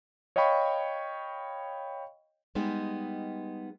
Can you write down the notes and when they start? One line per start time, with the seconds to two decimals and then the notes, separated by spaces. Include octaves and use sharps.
0.36 C#5 D#5 F5 G5 B5 C#6
2.55 G3 G#3 B3 D#4